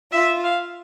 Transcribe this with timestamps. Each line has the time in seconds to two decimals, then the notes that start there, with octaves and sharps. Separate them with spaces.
0.12 F4 E5
0.44 F5